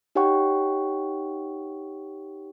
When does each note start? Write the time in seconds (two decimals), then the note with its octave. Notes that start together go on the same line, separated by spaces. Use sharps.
0.15 D#4 G4 C#5 F#5 G5 C#6